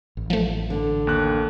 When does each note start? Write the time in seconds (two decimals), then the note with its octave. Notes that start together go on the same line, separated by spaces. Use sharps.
0.17 A1
0.30 F3 A3
0.70 D3
1.07 D#2 F#6